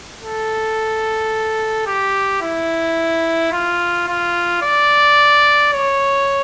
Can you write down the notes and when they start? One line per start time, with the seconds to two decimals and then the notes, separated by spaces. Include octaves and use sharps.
0.21 A4
1.87 G4
2.42 E4
3.52 F4
4.07 F4
4.62 D5
5.72 C#5